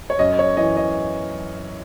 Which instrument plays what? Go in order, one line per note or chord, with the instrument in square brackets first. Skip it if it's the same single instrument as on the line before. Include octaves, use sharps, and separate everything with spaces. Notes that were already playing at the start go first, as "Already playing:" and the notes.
[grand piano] C#5
F#2 D#5
C#5
E3 D#5
D#5